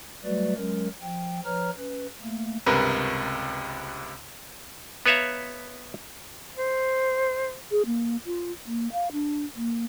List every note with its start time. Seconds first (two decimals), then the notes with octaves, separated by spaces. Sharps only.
0.24 F#3 G3 A3 F#4 B4 D5
0.56 F#3 G#3 C#4 A#4
1.01 F3 G5
1.45 F3 B4 C#5 A#5 F6
1.77 C#4 B4
2.21 A3 A#3
2.66 C#2 G2 C3 A#4 B4
5.06 B3 B4 C#5 E5 F5 A#5
6.57 C5
7.71 G#4
7.86 A#3
8.26 F4
8.66 A#3
8.92 F5
9.12 D4
9.56 A#3